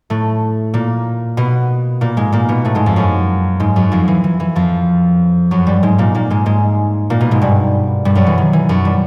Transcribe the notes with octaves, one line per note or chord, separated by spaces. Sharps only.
A2 A3
A#2 A#3
B2 B3
A#2 A#3
G#2 G#3
A#2 A#3
B2 B3
A2 A3
G#2 G#3
F2 F3
F#2 F#3
G#2 G#3
F#2 F#3
F2 F3
E3
E3
E3
F2 F3
F#2 F#3
G2 G3
G#2 G#3
A#2 A#3
A#2 A#3
G#2 G#3
G#2 G#3
A#2 A#3
B2 B3
G#2 G#3
G2 G3
G2 G3
F#2 F#3
E3
D#3
E3
F#2 F#3
G3